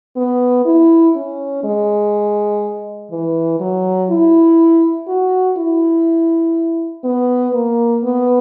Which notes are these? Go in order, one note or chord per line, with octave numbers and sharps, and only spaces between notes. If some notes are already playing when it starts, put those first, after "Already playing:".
B3
E4
C#4
G#3
E3
F#3
E4
F#4
E4
B3
A#3
B3